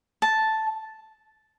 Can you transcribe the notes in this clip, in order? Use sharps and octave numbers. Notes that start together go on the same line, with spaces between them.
A5